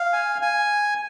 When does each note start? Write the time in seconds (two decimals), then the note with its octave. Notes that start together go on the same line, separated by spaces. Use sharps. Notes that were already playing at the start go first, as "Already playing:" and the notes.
Already playing: F5
0.13 G#5
0.42 G#5